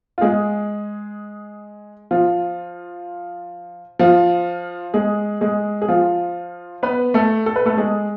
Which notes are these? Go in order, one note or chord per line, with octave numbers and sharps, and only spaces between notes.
F4
G#3 G#4
F3 F4
F3 F4
G#3 G#4
G#3 G#4
G#4
F3 F4
B3 B4
A3 A4
A4
B4
A3 A4
G#3 G#4